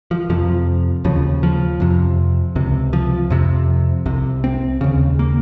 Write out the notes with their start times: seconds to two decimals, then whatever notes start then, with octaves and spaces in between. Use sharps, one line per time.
0.11 F3
0.30 F2 C3 F3
1.04 D#2 C#3 F3
1.43 F3
1.80 F2 C3
2.55 C#2 C3
2.93 F3
3.30 F2 C3
4.06 C2 C3
4.44 C4
4.81 D#2 C#3
5.19 A#3